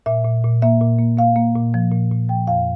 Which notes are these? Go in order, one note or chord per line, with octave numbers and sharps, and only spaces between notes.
A#2 E5
A#2
A#2
A#3 E5
A#2
A#3
A#3 F5
A#3
A#2
F3
A#2
A#2
F3 G5
F2 F5